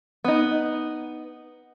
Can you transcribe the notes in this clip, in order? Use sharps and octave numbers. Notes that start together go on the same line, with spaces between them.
B3 D#4